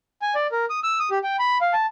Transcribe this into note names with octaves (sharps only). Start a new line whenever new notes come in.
G#5
D5
A#4
D#6
E6
D#6
G4
G5
B5
F5
A5